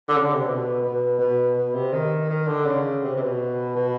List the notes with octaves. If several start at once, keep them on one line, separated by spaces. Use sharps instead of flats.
D3
C#3
D3
C3
B2
B2
B2
B2
C3
D#3
D#3
D3
C#3
C3
C3
B2
B2